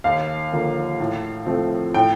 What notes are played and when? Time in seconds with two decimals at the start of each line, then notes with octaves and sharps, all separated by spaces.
0.04 D#2 F5
0.53 D3 F3 A#3
1.00 A2
1.46 F3 A3 C4
1.94 A2 G5